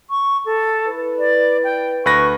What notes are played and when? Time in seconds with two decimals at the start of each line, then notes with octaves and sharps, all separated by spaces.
0.10 C#6
0.46 A4
0.87 E4 B4
1.19 D5
1.64 G5
2.06 D2 B4 C#6 A#6